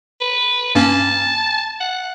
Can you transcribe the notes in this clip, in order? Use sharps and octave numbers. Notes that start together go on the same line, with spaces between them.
B4
G2 A#3 C#4 A5
F#5